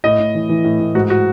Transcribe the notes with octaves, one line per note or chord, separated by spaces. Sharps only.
A2 D#5
A2
E3
E3
A2
A2
G#2 F#4
F#4